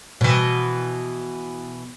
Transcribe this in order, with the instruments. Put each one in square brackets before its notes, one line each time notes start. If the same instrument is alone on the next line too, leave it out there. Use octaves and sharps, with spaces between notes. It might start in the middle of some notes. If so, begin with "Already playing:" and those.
[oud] B2 E3